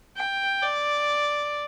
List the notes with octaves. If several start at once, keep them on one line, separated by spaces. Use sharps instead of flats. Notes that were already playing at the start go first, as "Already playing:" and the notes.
G5
D5